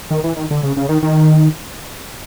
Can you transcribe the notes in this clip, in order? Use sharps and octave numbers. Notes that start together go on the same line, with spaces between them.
D#3
E3
D#3
D3
C#3
C#3
D#3
D#3